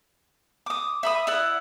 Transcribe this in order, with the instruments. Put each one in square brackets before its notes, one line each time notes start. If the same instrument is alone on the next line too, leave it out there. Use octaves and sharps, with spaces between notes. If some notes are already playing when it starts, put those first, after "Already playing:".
[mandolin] D6 D#6
E5 B5 D#6
E4 D5 F#5